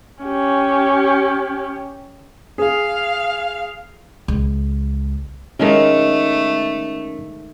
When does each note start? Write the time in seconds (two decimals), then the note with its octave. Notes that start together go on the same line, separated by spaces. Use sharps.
0.23 C#4 G4
2.58 G#4 F5
4.28 C#2
5.60 D#3 G#3 A3 C#4 A#4 F5